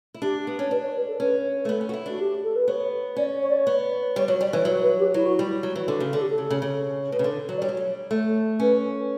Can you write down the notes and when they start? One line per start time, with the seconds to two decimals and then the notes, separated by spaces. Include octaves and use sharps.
0.14 E4
0.21 D4 G4
0.47 B3
0.59 C#4
0.71 D4 B4
0.83 C#5
0.95 B4
1.07 A4
1.20 C#4 B4
1.65 A3
1.69 B3 A4
1.81 C#4
1.89 F#4
1.94 E4
2.06 D4 F#4
2.19 G4
2.43 A4
2.55 B4
2.68 B3 C#5
3.17 C#4 D5
3.42 C#5
3.49 D5
3.56 C#5
3.67 B3
4.16 G3 C#5
4.28 F#3 C#5
4.41 G3 D5
4.53 E3 C#5
4.65 F#3
4.81 B4
4.98 G4
5.14 F#3 E4
5.25 F#4
5.35 E4
5.39 G3
5.63 F#3
5.76 E3 F#4
5.88 D3 F#4
6.00 C#3
6.13 D3 A4
6.21 G4
6.29 A4
6.38 C#3
6.50 C#3
6.62 C#3
7.11 B2 B4
7.19 C#3
7.24 D3
7.49 F#3
7.57 D5
7.61 G3 C#5
7.69 F#3
7.77 G3
8.11 A3
8.60 C#4 B4